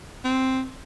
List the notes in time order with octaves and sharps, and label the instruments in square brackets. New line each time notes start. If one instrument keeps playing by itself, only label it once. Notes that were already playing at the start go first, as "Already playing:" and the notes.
[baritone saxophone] C4